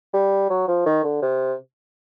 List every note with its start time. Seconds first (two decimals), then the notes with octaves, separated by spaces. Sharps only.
0.14 G3
0.50 F#3
0.68 F3
0.86 D#3
1.04 D3
1.22 C3